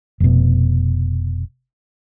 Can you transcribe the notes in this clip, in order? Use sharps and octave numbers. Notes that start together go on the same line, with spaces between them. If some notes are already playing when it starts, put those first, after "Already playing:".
F1 B2